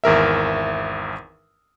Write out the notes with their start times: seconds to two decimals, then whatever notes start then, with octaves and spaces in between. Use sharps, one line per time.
0.04 G#1 E2 A#4 E5